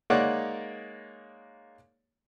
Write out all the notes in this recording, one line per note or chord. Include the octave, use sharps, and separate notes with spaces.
G#3 A#3 D#4 C#5 D5 F#5